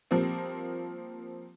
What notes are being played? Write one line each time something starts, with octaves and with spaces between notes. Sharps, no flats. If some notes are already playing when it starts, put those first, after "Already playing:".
F3 G3 A#3 C4